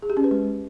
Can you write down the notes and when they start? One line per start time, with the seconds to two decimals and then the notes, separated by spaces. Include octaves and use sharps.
0.02 G#4
0.10 G4
0.17 C#4
0.24 B4
0.31 G#3